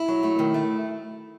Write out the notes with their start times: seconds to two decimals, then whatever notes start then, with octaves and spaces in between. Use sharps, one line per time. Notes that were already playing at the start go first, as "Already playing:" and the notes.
Already playing: E4
0.08 F#3
0.23 A3
0.39 D#3
0.54 A3